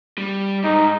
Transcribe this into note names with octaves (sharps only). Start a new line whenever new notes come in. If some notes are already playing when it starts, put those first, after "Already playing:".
G3
G#2 D#4